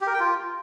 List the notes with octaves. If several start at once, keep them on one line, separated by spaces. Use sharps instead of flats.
G4
A#4
G5
F4